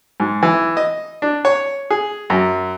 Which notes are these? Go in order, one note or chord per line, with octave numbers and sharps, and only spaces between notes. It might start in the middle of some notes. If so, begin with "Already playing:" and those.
G#2
E3
D#5
D4
C#5
G#4
F#2